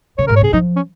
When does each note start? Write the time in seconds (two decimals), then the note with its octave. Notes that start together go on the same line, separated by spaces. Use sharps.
0.18 C#3 C#5
0.27 G#2 A#4
0.36 C#5
0.41 C#3 G#4
0.53 F3 D#4
0.76 C#4